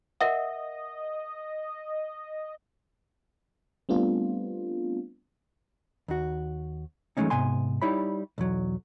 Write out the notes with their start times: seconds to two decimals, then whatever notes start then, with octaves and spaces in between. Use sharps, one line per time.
0.20 A#4 D#5 E5 F#5
3.89 G3 A3 B3 C4 D4 F4
6.08 D#2 F#4
7.17 E3 F#3 G#3 A3 C#4 D#4
7.30 G#2 C3 B3 G#5 C6
7.82 G3 D#4 E4 C#5 B5
8.38 B1 E2 F#3